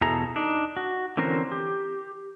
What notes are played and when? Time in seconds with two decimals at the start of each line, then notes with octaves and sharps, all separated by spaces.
0.01 E2 B2 E3 G#4 A4 A#5
0.36 D4 D#4
0.77 F#4
1.17 D3 E3 C4 C#4 A#4 C5
1.52 G4